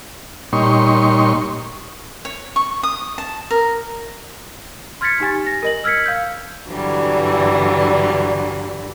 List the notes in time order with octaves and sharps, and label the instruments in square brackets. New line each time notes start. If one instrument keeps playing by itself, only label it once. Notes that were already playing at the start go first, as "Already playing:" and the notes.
[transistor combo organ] A#2 G3 D#4 C#5 C6 C#6
[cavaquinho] C#5
C#6
D#6
A5
A#4
[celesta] C6 F6 G#6 A6 B6 C#7
D#4 G4 G#5 A6
A#6
A#4 D#5 F#7
E6 F6 G#6 B6 C#7
F5 G6
[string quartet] G2 D3 E3 F#3 G3